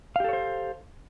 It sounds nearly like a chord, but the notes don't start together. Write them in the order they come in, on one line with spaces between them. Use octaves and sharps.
F5 G4 A4 C#5 C5